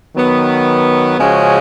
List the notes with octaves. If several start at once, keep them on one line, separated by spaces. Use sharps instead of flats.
D#3 F#3 B3
C#3 F3 G#3 C#4 F#4